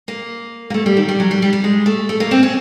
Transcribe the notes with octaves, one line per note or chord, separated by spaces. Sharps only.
A#3
A#3
A3
G3
D#3
G3
F#3
G3
G3
G3
G#3
A3
A3
A#3
C4
C#4